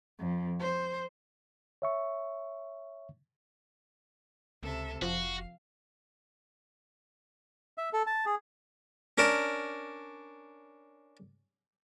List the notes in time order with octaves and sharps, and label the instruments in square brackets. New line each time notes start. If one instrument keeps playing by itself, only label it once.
[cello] F2
C5
[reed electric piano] C#5 E5 C#6
[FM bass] C#2 [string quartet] C3 A4 E5
[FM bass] F1 [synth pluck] F3 [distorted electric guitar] F#4 [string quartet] F5
[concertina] E5
A4
A5
G#4
[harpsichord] C#4 D4 A#4